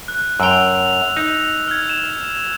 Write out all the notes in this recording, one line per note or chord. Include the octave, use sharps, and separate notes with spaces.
F#6
F#2 G5 E6 F7
D#4
F6 G#6
E7